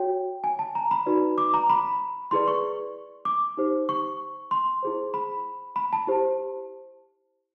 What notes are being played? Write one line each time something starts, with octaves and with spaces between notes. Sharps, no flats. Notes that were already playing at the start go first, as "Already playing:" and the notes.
Already playing: F#4 C#5 G5
G#5
A5
A#5
B5
D#4 F#4 B4 D5
D6
A#5
B5
E4 G#4 B4 D5 C6
C#6
D6
D#4 G4 C5
C#6
C6
E4 G#4 C5
B5
B5
A5
E4 G4 C5